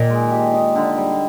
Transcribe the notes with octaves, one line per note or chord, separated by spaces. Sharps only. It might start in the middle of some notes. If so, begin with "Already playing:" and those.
Already playing: A#2 D#3
G#3
G4
D#4
D3
G3